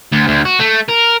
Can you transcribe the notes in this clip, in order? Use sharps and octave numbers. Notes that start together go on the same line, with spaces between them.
D2
D2
F#4
A3
A#4